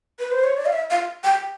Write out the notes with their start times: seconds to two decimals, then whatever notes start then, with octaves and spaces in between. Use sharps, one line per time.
0.19 B4
0.32 C5
0.44 C#5
0.57 D5
0.66 F5
0.73 E5
0.90 F5
1.24 G5